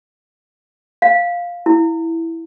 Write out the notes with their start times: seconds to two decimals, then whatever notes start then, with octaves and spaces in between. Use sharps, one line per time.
1.02 F5
1.66 E4